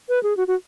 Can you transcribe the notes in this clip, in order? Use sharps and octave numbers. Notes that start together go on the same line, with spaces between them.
B4
G#4
F#4
F#4